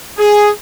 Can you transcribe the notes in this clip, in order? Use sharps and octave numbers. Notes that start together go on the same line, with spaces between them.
G#4